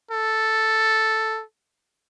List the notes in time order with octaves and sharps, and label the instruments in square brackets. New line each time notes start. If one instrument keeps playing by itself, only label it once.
[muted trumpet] A4